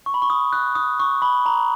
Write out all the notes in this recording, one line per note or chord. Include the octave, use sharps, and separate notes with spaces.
C#6
B5
C#6
D#6
F#6
D#6
C#6
B5
A#5